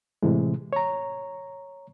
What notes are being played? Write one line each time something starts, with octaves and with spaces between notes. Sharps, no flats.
A2 C3 E3 G#3
C#5 A#5